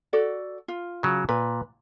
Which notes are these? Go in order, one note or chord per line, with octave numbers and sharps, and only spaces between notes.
F#4 A4 D5
F4
C#3 F#3
A#2 B4